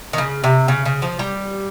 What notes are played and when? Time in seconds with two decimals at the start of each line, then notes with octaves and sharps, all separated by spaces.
0.13 D#3
0.18 C#3
0.44 C3
0.68 C#3
0.86 C#3
1.02 F3
1.19 G3